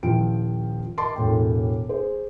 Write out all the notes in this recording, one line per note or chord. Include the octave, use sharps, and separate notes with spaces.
D#1 F3 E4 G5 D7
A#4 D#5 A5 B5 C6 D6
E1 A2 G5
G#4 C5